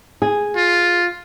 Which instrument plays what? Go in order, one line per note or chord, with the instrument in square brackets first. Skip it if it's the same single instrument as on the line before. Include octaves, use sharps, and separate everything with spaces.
[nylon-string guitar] G#4
[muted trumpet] F4